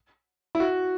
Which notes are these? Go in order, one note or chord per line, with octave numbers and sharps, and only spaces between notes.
E4
F#4